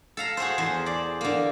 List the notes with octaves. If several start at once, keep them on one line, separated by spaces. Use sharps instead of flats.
A4 F5 A#5
F#4 G#4 A4 C5
E2 C5
D5
D3 A#3